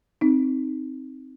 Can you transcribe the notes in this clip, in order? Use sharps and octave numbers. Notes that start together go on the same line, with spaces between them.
C4 D#4